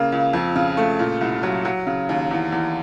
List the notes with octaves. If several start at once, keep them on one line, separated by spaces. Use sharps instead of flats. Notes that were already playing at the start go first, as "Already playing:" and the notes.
Already playing: C#3 A#3
C#2
F2
C#3
A3
A#2
C2
F#3
F#3
C#3
D#2
E2
E2